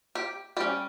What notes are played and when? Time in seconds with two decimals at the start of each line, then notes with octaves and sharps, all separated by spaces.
0.15 G4
0.57 G3 C#4 G4